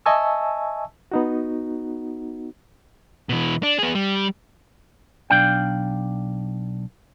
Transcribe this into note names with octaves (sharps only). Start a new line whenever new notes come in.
D#5 E5 G#5 A5 C#6 E6
B3 D#4 F#4
B2 E3
D4
B3 G#4
G3
B1 D4 D5 F5 G5